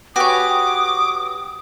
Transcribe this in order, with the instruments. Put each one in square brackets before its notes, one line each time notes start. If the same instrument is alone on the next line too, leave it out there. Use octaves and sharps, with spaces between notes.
[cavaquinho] F#4 C#5 [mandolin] G4 B4 G#5 [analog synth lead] D6 [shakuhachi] D#6